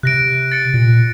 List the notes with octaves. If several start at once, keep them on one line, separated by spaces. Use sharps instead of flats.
C3 F#6 A#6 D7
A6 C#7 D7
A#2